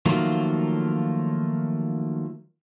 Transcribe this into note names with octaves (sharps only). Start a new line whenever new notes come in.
D#3 F3 F#3 A3 A#3 F4